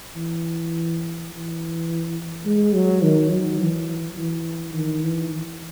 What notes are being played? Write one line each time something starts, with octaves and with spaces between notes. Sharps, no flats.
E3
E3
G#3
F#3
D#3
F#3
E3
E3
D#3
E3